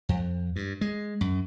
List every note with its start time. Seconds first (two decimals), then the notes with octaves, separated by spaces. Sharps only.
0.09 F2
0.56 G2
0.81 G#3
1.21 F#2